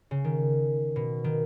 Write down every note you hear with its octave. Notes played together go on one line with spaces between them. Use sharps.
C#3
D#3
B2
D#3